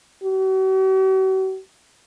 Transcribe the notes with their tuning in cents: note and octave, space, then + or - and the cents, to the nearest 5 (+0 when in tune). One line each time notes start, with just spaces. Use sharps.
F#4 +45